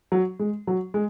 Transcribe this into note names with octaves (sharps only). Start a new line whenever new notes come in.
F#3
G#3
F#3
G#3